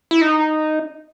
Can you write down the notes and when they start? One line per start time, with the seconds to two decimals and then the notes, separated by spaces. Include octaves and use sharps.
0.11 E4
0.22 D#4